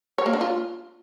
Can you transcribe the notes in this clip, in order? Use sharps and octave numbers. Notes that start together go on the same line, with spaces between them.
C#5
A#3
D4
F4